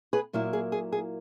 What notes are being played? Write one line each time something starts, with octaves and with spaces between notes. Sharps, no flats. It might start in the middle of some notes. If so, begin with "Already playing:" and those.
G#4 B4
A#2 F#3 A#3 E4
G#4
G#4
G#4